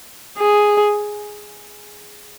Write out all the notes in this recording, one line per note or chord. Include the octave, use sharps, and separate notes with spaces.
G#4